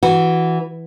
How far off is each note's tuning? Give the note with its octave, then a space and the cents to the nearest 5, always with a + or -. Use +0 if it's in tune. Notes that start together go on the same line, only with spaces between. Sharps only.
E3 +0 F#4 +0